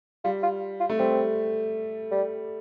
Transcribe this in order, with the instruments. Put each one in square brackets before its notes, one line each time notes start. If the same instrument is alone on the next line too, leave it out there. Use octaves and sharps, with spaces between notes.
[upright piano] G3 [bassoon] F4
[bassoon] F4
F4
[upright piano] A3
[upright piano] G3 [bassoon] C4
[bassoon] G3